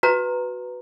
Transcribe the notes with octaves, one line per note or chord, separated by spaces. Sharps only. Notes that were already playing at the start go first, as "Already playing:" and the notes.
F#4 B4 A#5